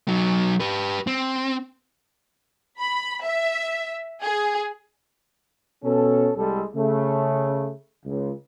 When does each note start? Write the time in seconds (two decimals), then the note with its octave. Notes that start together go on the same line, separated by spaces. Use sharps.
0.08 F#3 D#4
0.60 G4 B4
1.07 C4
2.80 B5
3.25 E5
4.23 G#4
5.84 B2 C#4 A4
6.36 C2 G3 G#3 A4
6.76 C#3 A3
8.06 C#2